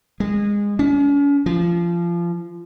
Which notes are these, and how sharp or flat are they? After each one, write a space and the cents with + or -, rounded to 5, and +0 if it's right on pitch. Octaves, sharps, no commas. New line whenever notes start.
G#3 -25
C#4 +40
F3 -25